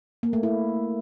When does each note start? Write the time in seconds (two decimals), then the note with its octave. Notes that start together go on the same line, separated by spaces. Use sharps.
0.23 A#3
0.33 A3
0.43 E4